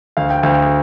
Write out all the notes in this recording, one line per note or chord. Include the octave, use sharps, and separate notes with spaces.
D2 F5
G5
D2 F5